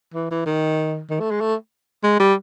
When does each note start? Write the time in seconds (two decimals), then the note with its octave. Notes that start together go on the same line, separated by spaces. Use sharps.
0.14 E3
0.31 E3
0.46 D#3
1.10 D#3
1.20 A3
1.30 G#3
1.40 A3
2.04 G#3
2.19 G3